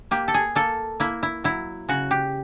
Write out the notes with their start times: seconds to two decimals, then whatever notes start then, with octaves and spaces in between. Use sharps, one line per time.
0.11 A#3 G4
0.28 A4
0.34 G#4
0.55 A#3 A4
1.00 A#3 E4
1.23 E4
1.44 F#3 E4
1.89 C#3 F#4
2.11 G4